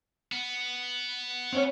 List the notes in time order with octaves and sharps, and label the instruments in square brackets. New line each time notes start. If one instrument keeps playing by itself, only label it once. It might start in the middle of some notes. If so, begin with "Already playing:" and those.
[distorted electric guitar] B3
[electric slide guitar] C4 C#4 C#5